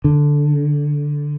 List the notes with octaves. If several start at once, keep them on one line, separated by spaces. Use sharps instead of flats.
D3